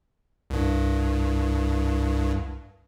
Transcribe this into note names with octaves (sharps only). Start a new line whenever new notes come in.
C2 G2